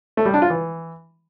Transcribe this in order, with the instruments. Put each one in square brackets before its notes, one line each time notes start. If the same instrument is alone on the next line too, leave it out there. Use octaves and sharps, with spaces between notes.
[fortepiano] A3
G3
D4
F4
E3